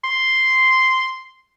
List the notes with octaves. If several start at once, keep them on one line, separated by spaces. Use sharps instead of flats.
C6